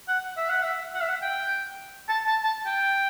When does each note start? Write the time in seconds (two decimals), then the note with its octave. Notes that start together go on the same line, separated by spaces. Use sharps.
0.08 F#5
0.37 E5
0.50 F#5
0.63 E5
0.94 F#5
1.01 E5
1.09 F#5
1.22 G5
2.09 A5
2.26 A5
2.43 A5
2.66 G5